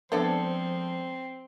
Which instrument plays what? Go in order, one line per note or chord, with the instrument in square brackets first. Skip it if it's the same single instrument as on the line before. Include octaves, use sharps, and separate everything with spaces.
[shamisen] D3 A3 B3 [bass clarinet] F3 [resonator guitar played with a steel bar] G#3 A4 D5 [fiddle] C4